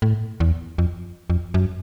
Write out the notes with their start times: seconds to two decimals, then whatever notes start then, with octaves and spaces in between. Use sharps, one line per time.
0.02 A2
0.40 E2
0.78 F2
1.30 F2
1.54 F#2